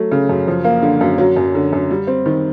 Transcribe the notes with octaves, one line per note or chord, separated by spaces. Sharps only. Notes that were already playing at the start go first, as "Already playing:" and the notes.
Already playing: F#3 A3
C#3
F#2
F3
A#3
D3
F#2
F#3
F#2
D3
F#2
G3
C4
D#3